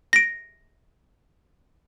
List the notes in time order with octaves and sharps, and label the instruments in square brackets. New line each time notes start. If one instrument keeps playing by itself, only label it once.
[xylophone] A#6 D7